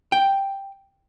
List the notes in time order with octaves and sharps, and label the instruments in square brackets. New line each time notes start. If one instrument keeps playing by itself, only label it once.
[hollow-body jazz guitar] G5